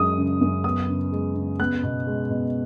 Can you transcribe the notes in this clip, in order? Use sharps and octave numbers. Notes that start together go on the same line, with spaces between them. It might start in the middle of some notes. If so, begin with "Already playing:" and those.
Already playing: F#2 G#3 D#6
C#3
F#2
B3 D#6
C#3
G#3
C#3
B3 F#6
B2
G#3
B2